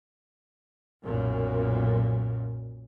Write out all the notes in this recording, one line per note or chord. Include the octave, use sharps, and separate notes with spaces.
B1 F#2 A#2